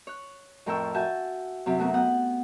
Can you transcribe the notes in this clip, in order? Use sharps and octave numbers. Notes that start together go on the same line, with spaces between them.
C#5 F#6
F2 A2 A#4 G5 C#6 E6
F#4 E5 G#5 A5 G6
F#2 C3 F#3
A3 B3 F#4 A#4
B3 F#5 G5 F#6